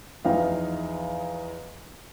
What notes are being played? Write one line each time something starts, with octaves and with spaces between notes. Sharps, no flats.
E2 F3 D#4 F5